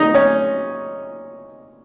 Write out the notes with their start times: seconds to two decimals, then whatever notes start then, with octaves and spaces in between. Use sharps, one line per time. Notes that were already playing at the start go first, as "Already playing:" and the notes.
Already playing: D#4
0.14 C#4